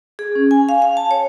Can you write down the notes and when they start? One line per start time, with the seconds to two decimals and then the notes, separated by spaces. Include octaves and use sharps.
0.19 G#4
0.35 C#4
0.51 G#5
0.69 F5
0.82 F5
0.97 A5
1.11 C#5